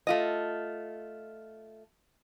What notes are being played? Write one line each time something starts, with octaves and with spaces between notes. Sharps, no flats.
A3 F4 D#5